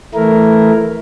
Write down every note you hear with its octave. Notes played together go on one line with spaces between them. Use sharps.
E3 A3 E4 A#4